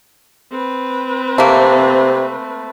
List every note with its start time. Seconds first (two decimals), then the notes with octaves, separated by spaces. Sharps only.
0.51 C4 B4
1.38 C3 A3 A#3